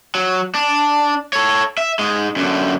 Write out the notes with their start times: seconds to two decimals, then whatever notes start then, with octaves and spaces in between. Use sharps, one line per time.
0.15 F#3
0.54 D4
1.33 A4 C#5
1.78 E5
1.99 G#2 G#3
2.36 F#2 D3